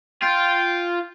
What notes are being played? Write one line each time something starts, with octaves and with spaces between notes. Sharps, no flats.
F4 G5